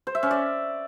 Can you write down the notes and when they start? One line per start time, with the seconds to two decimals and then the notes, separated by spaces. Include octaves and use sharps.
0.07 C5
0.15 E5
0.23 C#4
0.31 D5